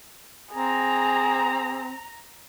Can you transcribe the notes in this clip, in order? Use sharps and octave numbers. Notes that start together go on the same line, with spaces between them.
C4 G#4 A#5